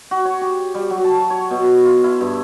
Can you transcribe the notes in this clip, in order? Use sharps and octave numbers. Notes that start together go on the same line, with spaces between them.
F#4
C#5
G4
G3
F#3
A5
C#5
B2
B4
F4
E4
G2